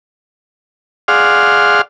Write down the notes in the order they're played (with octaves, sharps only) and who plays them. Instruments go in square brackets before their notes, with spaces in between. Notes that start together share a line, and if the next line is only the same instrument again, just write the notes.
[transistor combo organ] G#4 D5 F5 F#5 C6 F6